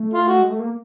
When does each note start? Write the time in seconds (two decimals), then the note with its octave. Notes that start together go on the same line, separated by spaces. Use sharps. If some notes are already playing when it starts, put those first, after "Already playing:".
Already playing: A3
0.14 F4
0.28 F#4
0.39 G#3
0.49 A3
0.60 A#3